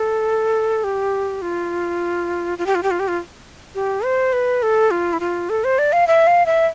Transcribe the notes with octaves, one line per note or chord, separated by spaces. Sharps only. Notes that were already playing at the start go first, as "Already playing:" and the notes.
Already playing: A4
G4
F4
F4
G4
F4
G4
F4
G4
F4
G4
C5
B4
A4
F4
E4
F4
A4
C5
D5
F5
E5
F5
E5